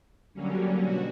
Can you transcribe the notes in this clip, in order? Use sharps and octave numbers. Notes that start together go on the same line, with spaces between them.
D3 F#3 G3 A#3 C#4
B2 F#4